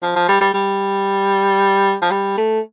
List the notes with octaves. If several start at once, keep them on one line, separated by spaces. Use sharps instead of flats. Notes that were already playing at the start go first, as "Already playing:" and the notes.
F3
F3
G3
G3
G3
F3
G3
A3